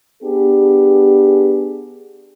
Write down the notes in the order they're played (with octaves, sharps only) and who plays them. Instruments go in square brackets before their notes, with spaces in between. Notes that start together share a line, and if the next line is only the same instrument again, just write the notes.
[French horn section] B3 D4 G4 G#4